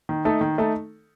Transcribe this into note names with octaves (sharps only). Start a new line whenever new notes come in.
D#3
A3 D#4 A4
D#3
A3 D#4 A4